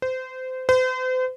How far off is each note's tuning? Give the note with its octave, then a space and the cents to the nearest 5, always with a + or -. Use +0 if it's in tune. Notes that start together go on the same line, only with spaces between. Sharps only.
C5 -25
C5 -40